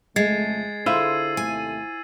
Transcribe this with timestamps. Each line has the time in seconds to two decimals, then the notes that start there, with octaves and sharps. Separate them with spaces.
0.16 F2 C#3 G#3 A3 G#6 A6 C7
0.86 D3 E4 F4 G#4 A4 C5 E6 D#7
1.37 D#2 C3 A3 G#5